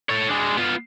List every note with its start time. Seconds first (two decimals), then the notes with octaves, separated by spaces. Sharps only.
0.10 A4 C#5
0.29 G#3 D4
0.58 B3 F4